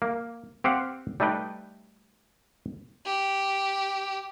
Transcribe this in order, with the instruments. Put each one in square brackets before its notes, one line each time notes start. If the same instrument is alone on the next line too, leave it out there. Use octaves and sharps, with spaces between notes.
[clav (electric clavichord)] A#3
C4 G4 C5 F5 F#5
G3 A3 D#4 B4 G5
[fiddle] G4